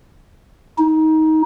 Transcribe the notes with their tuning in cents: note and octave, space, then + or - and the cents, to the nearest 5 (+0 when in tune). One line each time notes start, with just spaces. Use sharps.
D#4 +20